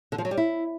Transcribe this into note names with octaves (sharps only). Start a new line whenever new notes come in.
D3
F3
F#3
G3
E4